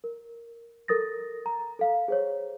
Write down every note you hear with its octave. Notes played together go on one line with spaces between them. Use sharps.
A#4
A4 A#4 D#6 A6 A#6
A#5
A4 F5
G#4 C5 C#5